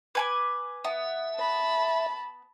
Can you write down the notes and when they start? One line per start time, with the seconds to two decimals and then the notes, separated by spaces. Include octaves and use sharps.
0.15 B4 G#5 D6
0.85 B3 E5
1.35 A5 B5